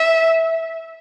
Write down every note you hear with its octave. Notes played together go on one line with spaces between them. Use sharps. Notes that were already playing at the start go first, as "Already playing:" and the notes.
Already playing: E5